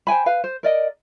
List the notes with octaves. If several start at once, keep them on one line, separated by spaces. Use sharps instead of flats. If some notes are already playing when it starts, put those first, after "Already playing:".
C5 G5 G#5 B5
B4 F5
C5
A#4 D5 D#5